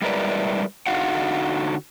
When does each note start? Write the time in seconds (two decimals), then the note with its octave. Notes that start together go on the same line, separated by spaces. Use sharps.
0.02 G3 G#3 E4 A#4 B4 D5
0.87 D3 D#4 F#4 F5 F#5